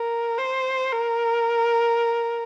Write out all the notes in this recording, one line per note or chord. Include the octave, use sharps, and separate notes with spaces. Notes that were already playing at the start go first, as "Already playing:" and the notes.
Already playing: A#4
C5
A#4